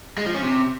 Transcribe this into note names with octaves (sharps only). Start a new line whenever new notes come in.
G#3
F3
C#4
C3